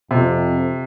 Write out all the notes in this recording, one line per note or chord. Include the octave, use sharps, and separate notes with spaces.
F2 C3